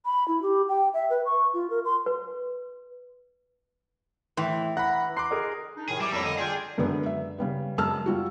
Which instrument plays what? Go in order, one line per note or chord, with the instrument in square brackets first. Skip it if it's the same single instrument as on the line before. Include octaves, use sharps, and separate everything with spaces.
[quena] B5
E4
G4
G5
E5
B4
C#6
F4
A#4
C6
[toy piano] B4
[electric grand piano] A2 [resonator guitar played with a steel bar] E3 [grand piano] G5 C6
[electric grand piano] F#5 B5 [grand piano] A#5 F#6 A#6
[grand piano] A#5 C6 [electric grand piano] D6 F#6 C7
[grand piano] G#4 A#4 D#5
[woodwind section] D4 D#4
[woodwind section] A2 C3 D#3 [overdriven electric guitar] G#4
[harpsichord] E3 [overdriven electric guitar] G3 [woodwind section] D6
[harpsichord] F2 G3 C#4 [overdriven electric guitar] A2 A#3 [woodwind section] A5 B5 E6
[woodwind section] D3 [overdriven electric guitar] D#5
[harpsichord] D4 [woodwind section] F4 G5 [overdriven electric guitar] G#4
[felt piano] F#2 D3 G#3 B3
E5
C#3 G3 B3
F#2 G#3 A5 E6 F6
G3 F4 F#4